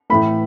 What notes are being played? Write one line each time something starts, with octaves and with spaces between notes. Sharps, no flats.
A2 E3 A3 B5